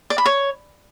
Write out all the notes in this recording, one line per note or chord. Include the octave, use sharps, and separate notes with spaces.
D5
B5
C#5